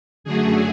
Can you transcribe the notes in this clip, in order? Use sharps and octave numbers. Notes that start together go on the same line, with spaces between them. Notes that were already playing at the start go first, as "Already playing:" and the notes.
F#2 D3 F#3 A3 G#4